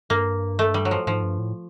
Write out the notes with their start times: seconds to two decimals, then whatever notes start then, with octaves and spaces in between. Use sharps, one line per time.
0.10 G2 A#3
0.59 A3
0.74 G3
0.85 F#3
0.91 F3
1.07 G#2 F3
1.23 G2
1.38 A2